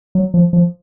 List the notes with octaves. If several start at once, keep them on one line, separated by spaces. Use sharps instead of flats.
F#3
F3
F3